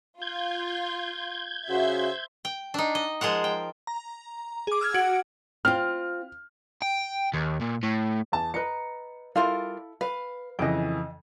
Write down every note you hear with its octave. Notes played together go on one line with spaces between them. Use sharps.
F4 G6 G#6
C#3 F#4 C5 E5
G5
D4 D#4
D#5
F3 G#3 F4 A#4 F#5
G5
A#5
G#4 D6
E6 F6 G#6
F#4 F#5 G#6 D7
C4 F4 F6
G5
D#2
A#2
A2
E2 A5
B4 D#5 A#5 C#7
G3 E4 F4 A4 A#4 F5
B4 F5
F2 C#3 E3 D#5 G5